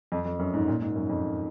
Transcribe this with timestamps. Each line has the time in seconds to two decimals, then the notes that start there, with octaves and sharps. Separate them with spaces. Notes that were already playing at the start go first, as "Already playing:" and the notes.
0.12 F2
0.25 F2
0.39 F#2
0.54 G#2
0.68 A#2
0.82 G#2
0.96 F#2
1.10 F2